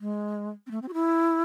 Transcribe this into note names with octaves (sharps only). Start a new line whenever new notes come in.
G#3
C4
A3
C4
F#4
E4